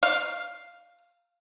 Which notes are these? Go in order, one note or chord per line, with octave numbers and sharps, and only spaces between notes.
F5